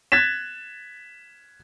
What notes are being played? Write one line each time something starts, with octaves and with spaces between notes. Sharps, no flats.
F#6 G#6 A6 B6 E7